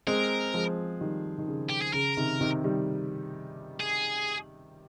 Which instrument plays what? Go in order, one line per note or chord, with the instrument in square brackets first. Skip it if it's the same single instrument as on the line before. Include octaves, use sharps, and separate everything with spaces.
[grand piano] G#3 C4 [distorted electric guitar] A#4
[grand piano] F3 G#3
D#3 G3
D#3
C#3
[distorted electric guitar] G4
G#4
[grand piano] C#3 [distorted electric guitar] A#4
[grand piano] C3 D#3
C3 D#3
D#3 G3
[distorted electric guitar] G#4